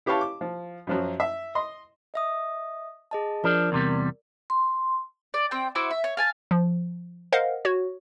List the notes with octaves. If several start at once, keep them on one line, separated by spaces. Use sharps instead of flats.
E4 G4 B4 C#5 F5 A5
D6
F3
F#2 F3 F#3
E5
D#5 C6
D#5 E5 D#6
G#4 D#5 A5
F3 D4 A#4 D5
E2 C3 G3
C6
D5
C4 G5
E4 F#4 C5 D6
E5
C#5
F5 G#5 A5
F3
A#4 C5 D#5 F5 F#5
F#4 C#5